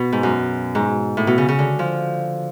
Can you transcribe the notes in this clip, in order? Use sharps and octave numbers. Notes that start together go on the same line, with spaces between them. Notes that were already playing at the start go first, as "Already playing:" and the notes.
Already playing: B2
G#2
F#2
G#2
A2
B2
C#3
C#3
D3
F3